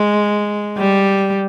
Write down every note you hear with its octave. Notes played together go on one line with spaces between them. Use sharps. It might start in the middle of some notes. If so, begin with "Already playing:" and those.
Already playing: G#3
G3